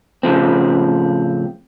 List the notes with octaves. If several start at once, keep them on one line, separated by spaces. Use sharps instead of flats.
A2 C#3 F3 C4